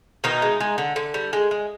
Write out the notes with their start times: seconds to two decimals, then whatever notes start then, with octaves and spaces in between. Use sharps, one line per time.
0.24 B2 D#3 D#4
0.42 G#3
0.60 G#3
0.78 D3
0.96 D3
1.14 G3
1.33 G#3
1.51 G#3